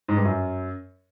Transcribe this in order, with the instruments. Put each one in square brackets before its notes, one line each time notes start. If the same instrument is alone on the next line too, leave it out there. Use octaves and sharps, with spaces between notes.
[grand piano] G#2
G2
F#2